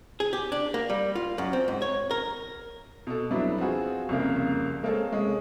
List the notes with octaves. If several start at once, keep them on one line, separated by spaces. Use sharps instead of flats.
G#4
G4
D4
A#3
G3
F4
F#2
C4
G#2
C#5
A#4
B2 A4
F2 F#3 G3 B3 D4 E4
C4 F4 F#4 G#4
C2 F2 C#3 A#3
G#3 A#3 C4 A4 C#5
C3 G#3 C#4